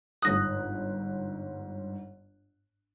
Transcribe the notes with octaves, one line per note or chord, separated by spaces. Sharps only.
G1 G#2 D#6 F#6 A#6